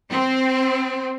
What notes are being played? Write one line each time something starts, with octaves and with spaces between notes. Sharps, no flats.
C4